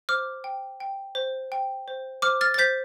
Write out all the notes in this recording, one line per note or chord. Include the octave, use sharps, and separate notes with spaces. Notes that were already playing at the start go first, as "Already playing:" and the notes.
C5 D6 F6
G5
G5
C5
G5
C5
C5 D6 F6
F6 A6
A6
C5 G6 B6